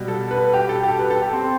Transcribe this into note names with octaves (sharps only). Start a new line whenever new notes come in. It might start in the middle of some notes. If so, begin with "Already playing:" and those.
Already playing: B2 G3
A4
B4
G4
A4
G4
B4
A4
G4
C4